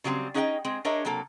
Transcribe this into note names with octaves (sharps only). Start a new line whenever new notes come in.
C#3 F#3 G3 A3 C4
C#4 D#4 G#4 D#5 F#5 G5
G#3 C4 G#4
D4 G#4 A#4 C#5 D#5 E5
C3 F#3 A#3 A4